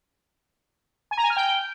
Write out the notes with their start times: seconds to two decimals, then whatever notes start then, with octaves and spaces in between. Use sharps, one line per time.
1.11 G#5
1.17 A#5
1.24 G#5
1.30 F6
1.37 G5